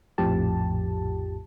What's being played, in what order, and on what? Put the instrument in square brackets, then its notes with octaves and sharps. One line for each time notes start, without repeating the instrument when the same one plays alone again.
[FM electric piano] A#1 F2 A2 F3 G4 A5